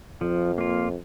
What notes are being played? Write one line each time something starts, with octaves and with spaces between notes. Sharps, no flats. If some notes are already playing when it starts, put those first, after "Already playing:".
F2 F3
A#3 F4